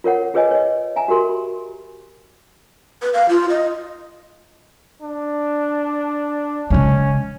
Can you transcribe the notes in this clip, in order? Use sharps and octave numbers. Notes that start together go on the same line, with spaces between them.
F4 A#4 C#5 F#5
F4 G#4 B4 C#5 D#5 G#5
C#5 D#5
E5 G#5 A#5
F#4 G4 A#4 C6
B5
B4
F5
F4
D#5
D4
C#3 G#3 C#4